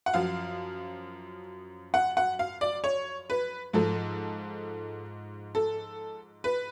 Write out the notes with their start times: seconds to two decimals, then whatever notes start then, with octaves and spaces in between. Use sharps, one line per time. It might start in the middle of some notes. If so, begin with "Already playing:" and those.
0.06 F#5
0.14 F#2 F3 F5
1.94 F#5
2.17 F#5
2.39 F5
2.61 D5
2.84 C#5
3.30 B4
3.73 G#2 F3 A4
5.55 A4
6.44 B4